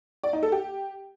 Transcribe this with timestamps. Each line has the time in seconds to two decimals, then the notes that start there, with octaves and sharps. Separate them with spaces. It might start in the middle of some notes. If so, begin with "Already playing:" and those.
0.23 D5
0.33 D#4
0.43 A4
0.52 G4